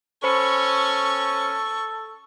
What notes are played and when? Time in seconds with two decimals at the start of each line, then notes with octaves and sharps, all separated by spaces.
0.24 C#4 A4 C5 B5 C#6 C#7